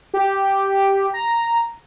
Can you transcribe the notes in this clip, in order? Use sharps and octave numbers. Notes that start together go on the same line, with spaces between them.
G4
A#5